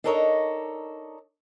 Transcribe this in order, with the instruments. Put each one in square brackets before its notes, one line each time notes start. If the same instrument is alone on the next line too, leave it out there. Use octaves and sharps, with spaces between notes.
[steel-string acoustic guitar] D4 D#4 A4 A#4 C#5 D#5